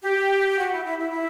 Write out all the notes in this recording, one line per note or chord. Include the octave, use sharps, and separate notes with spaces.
G4
F#4
E4
E4
E4
E4